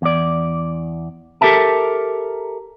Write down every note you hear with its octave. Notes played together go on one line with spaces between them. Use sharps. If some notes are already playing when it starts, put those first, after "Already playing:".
E2 D5
G4 A4 A#4 E5 A5